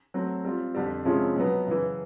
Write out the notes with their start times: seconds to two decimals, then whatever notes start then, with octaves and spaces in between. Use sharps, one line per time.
0.14 F#3 A3 C4
0.45 G3 C4 F4
0.75 F2 D3 G3
1.05 C3 F3 G#3 C#4 E4
1.36 B2 F#3 B3
1.67 F#2 C#3 E3